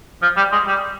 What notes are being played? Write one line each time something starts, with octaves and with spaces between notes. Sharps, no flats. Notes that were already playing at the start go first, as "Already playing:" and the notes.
F3
G3
G#3
G3